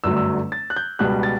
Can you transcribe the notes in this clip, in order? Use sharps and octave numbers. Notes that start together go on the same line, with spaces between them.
G1 F#2 D3 F#3 A3 E6
E6
A6
F#6
G6
C#2 B2 G3 B3 F#6
A6